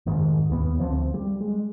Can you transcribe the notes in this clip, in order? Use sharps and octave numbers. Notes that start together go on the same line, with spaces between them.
F1 G#2 D#3
D#2 B3
D2 F3 C4
G3
G#3